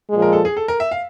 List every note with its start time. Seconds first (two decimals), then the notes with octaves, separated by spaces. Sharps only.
0.09 A#2 F3 G#3
0.22 A#4
0.33 A4
0.45 G#4
0.57 A4
0.68 A#4
0.80 E5
0.91 F5